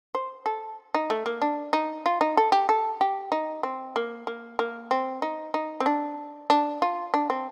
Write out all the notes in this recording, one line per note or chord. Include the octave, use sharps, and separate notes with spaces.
C5
A4
D#4
A3
A#3
D4
D#4
F4
D#4
A4
G4
A4
G4
D#4
C4
A#3
A#3
A#3
C4
D#4
D#4
C4
D4
D4
F4
D4
C4